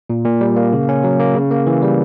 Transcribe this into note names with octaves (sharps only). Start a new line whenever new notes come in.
A#2
A#2
G3
A#3
C#3
C#4
F#3
A#3
C#3
A#3
E3
G3